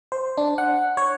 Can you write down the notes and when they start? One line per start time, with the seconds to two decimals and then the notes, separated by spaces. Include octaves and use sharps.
0.12 C5
0.37 D4
0.58 F#5
0.97 C#5